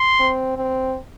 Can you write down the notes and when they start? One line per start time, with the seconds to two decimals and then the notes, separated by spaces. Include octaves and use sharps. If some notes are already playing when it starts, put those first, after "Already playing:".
Already playing: C6
0.19 C4
0.57 C4